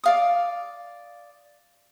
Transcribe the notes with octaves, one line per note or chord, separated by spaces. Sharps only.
D5 F5 D#6